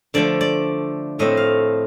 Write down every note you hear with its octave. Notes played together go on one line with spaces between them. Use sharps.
D3 F3 A3 D5
D5
A2 A3 C4 D#5
F5